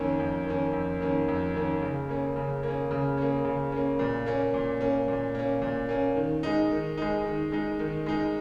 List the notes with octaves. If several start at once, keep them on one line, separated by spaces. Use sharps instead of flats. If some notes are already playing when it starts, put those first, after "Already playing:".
Already playing: F2 D#3 A#3 C#4
F2
D#3 A#3 C#4
F2
D#3 A#3 C#4
F2
D#3 A#3 C#4
C#3
A#3 C#4
C#3
A#3
C#4
C#3
A#3 C#4
C#3
A#3 C#4
A#2
A#3 C#4
A#2
A#3 C#4
A#2
A#3 C#4
A#2
A#3 C#4
D#3
G#3 D#4
D#3
G#3 D#4
D#3
G#3 D#4
D#3
G#3 D#4